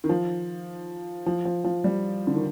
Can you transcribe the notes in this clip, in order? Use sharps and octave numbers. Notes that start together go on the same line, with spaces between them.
D#3
F3
F3
F3
F3
G3
D3
D#3